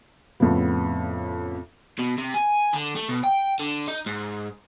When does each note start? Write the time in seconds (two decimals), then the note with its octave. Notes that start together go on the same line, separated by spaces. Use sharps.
0.40 F2 A2 C#3 B3
1.99 B2
2.18 C3
2.35 G#5
2.74 D3
2.96 A3
3.08 B2
3.24 G5
3.59 D3
3.88 D#4
4.06 G#2